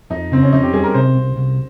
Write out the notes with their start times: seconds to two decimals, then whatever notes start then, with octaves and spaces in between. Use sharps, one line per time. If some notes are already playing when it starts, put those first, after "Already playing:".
0.10 F2 D#4
0.32 C#3 C4
0.43 C#4
0.52 F2 D#4
0.63 G4
0.73 G3 G#4
0.84 A#4
0.94 C3 C5
1.15 C2
1.36 C2